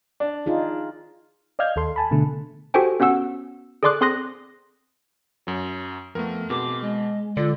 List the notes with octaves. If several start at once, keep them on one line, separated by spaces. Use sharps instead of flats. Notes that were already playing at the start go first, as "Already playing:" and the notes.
D4
D#4 F4 G#4
D5 D#5 F5 F6 G6 G#6
D#2 A4 C6
G#5 A5 B5
B2 D3 A3
F#4 G4 A4 C5 G5 G#5
B3 C#4 F#4 F#5 E6
G#4 A4 D5 C6 D6 F#6
C4 G#4 C6 D#6 F#6 A#6
F#2 F#3
F2 A3 B3 A#4
B2 C4 G#4 A#4 D6
G#3 D#5
D3 F4 D5